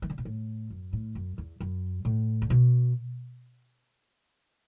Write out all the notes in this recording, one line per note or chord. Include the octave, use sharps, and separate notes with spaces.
E3
D3
B2
A2
F#2
A2
F#2
E2
F#2
A2
D3
B2